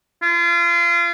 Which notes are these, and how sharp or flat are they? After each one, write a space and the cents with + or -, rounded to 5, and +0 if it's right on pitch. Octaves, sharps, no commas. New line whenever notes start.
F4 -30